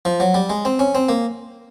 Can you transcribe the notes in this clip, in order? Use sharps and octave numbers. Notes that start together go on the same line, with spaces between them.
F3
F#3
G3
G#3
C4
C#4
C4
A#3